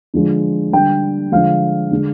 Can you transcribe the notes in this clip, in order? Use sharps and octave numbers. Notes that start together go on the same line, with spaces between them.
D3 F3 G#3
D3 G3 G5
D3 F3 G#3 F5
D3 G#3